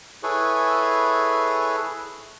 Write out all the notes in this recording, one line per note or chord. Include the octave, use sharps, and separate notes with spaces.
E4 G#4 A4 B4 C#5